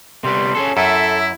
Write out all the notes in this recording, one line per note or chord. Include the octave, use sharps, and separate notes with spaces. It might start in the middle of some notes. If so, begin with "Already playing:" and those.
C3 G3 B3 C6
C#4 G#4 A4
F#2 E4 A4 E5